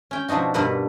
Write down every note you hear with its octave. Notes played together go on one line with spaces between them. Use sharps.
C#4 G5
B2 F3 D4 D#4 F#4
G2 B2 A#4 B4 F#5